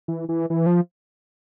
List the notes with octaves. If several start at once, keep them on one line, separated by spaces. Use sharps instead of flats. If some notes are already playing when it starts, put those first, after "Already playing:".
E3
E3
E3
F3